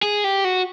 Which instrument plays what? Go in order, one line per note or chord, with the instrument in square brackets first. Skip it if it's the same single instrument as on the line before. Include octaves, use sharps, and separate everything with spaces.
[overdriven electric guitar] G#4
G4
F#4